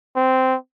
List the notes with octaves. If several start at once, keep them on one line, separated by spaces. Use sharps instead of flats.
C4